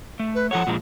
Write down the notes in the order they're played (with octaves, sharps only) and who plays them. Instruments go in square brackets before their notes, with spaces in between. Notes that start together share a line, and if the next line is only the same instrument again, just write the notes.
[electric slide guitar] A3
[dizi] B4
[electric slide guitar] F3 A4 C#5 [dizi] F#5
[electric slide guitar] A#2 F3 G#3